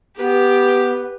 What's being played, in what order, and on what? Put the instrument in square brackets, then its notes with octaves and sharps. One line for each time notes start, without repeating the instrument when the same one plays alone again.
[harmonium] B3 [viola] G4 [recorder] B4